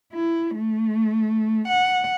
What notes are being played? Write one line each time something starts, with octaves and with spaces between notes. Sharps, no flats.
E4
A3
F#5